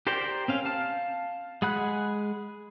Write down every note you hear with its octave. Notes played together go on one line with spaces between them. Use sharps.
G4 A#4 C5 D5 G5
C4 C#4 F5
F5 A5 F6
G#3 G#4 F#5 B5 F#6